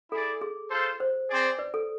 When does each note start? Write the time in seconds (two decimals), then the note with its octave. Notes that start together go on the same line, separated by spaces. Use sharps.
0.12 E4 G#4 A4 D5
0.41 G#4
0.70 F4 A4 C5
1.00 C5
1.29 C4 G#4 D5
1.59 B4 D5
1.74 A4